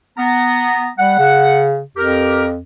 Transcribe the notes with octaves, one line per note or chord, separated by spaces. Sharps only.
B3 A#5
G3 F#5
C#3
F2 G4 A#4